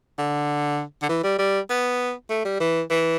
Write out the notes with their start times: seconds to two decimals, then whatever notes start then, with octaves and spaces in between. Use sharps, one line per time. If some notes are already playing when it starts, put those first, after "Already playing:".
0.18 D3
1.03 D3
1.09 E3
1.24 G3
1.39 G3
1.70 B3
2.30 A3
2.45 G3
2.60 E3
2.90 E3